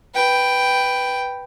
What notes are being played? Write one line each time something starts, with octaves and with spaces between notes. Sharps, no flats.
B4 G5